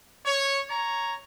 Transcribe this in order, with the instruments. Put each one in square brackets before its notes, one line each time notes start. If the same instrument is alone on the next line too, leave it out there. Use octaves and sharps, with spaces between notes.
[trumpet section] C#5
C#5 A#5